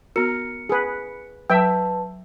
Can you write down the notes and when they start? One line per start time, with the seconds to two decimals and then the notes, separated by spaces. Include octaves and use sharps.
0.16 B3 F#4 A#4 C#7
0.69 G#4 B4
1.50 F#3 B4 E5 G5 A5